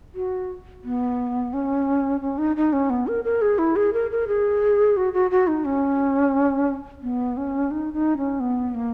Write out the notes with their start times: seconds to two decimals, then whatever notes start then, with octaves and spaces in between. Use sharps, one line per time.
0.15 F#4
0.84 B3
1.53 C#4
2.21 C#4
2.38 D#4
2.56 D#4
2.73 C#4
2.90 B3
3.07 A#4
3.24 A#4
3.42 G#4
3.59 E4
3.76 G#4
3.93 A#4
4.11 A#4
4.28 G#4
4.97 F#4
5.14 F#4
5.31 F#4
5.47 D#4
5.65 C#4
7.03 B3
7.37 C#4
7.71 D#4
7.93 D#4
8.17 C#4
8.40 B3
8.75 A#3